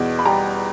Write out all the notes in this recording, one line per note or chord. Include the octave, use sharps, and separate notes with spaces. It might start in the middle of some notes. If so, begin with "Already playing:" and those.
Already playing: E2 B2
B5
G3 A#5